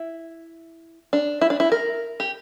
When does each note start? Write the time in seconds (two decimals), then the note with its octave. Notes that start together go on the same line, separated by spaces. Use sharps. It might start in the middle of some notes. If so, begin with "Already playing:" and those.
Already playing: E4
1.13 D4
1.41 E4
1.50 D4
1.60 E4
1.72 A#4
2.20 G4